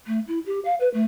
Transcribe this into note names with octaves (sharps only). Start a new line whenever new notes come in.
A3
E4
G4
F5
B4
A3